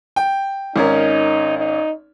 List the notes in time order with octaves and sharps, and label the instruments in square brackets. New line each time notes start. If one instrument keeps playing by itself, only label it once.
[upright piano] G5
[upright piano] G#1 C#4 A#4 [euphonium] D#4
[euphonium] D#4